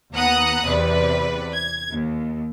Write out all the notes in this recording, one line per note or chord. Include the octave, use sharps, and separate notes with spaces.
D#2 B3 F#5 A#5 D#6 F#6
E2 C3 B4 D5
G#6
D#2